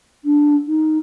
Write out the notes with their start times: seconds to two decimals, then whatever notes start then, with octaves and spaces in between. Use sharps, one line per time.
0.24 D4
0.67 D#4